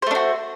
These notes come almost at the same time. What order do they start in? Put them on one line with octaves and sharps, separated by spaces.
C5 A3 D4 F#4